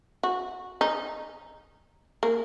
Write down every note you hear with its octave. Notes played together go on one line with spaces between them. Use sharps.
F#4
D#4
A#3